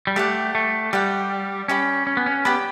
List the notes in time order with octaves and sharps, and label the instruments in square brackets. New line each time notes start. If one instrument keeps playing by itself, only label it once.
[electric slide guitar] G3
[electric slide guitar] A3 [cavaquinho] G4 D5 F#5
[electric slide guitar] A3
[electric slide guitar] G3 [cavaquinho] G4 D5 F#5
[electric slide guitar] C#4 [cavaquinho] G4 D5 G5 B5
[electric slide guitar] C#4
B3
C#4
[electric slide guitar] B3 [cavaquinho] G4 D5 G5 B5